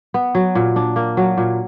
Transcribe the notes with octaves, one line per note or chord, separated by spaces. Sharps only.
B3
F#3
A#2
D4
A#3
F#3
A#2